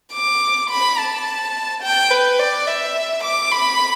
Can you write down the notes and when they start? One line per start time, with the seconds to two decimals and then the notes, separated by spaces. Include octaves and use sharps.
0.13 D6
0.69 B5
0.98 A5
1.82 G5
2.11 B4
2.39 D5
2.67 E5
3.23 D6
3.51 B5